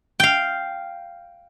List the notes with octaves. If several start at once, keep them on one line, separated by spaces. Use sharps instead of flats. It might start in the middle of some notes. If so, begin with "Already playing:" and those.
F5 G5